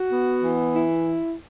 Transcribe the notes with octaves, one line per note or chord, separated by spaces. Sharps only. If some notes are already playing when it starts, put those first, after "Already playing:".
Already playing: F#4
B3
E3
E4